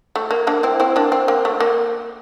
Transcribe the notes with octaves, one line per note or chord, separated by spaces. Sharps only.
A3
A#3
A#3 D4
C4 E4
C4 E4
A#3 D4
C4
A#3
A3
A#3